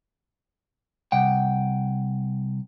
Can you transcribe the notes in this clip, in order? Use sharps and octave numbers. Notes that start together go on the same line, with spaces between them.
C2 F#5 G5